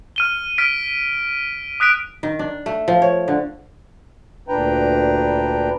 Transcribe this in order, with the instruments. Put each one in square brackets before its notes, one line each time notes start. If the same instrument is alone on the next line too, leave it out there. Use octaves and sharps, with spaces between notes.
[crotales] F6 D#7 G7
F6 B6 D7
D#6 F#6 B6 D7
[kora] D#3
D4
A3
F3
C#5
D3
[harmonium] D2 A#2 D4 B4 G5 A#5